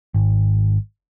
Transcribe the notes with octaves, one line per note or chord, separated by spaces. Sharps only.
G#1